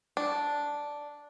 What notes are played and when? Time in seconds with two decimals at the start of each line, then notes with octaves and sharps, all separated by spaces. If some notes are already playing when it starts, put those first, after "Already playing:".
0.17 D4